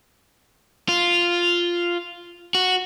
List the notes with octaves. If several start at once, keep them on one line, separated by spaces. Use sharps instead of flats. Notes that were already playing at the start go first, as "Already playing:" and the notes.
F4
F#4